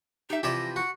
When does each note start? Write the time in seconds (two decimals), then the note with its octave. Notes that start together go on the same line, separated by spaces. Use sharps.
0.30 D#4 G4 E5 G6
0.43 C3 E3 F3 F4 G4 D5 A#6
0.76 F#4 C#7